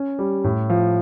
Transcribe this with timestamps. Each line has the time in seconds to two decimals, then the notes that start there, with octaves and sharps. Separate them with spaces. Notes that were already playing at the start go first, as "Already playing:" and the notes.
Already playing: C#4
0.19 G3
0.44 A2
0.70 F3